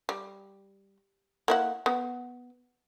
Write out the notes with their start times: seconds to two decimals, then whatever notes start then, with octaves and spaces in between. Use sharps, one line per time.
0.09 G3
1.48 A#3 E4 F#5
1.86 B3